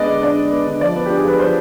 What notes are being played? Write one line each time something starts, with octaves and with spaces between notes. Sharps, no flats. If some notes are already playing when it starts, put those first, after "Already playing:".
Already playing: G#3 B3 D4 D5 D#5
D3
D4 D5
G#3
B3
D3
F3 D5
B3
D4 G4
G#4
F3 B4
F3 C5